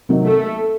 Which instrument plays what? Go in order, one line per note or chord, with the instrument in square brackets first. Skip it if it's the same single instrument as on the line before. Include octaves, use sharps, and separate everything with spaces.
[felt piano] C3 D#3 F#3
[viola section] A3